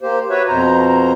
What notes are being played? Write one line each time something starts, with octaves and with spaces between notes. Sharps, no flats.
A#3 G4 C5
F#4 B4 C#5 E5
F2 B2 C5 A#5